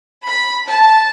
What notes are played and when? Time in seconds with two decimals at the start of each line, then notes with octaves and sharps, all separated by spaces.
0.25 B5
0.65 A5